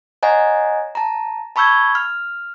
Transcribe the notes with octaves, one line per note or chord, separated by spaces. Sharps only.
C#5 D#5 F#5 G#5 A#5
A5 A#5
A5 B5 C#6 E6 G6 G#6
F6